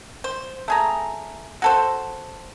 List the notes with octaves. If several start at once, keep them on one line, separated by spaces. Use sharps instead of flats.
C5
A3 G#4 A#5
F#4 A4 C5